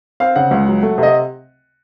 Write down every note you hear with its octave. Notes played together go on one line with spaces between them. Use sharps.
C4 F5
C#3 F#5
C#2
F#3
A3
C3 D#5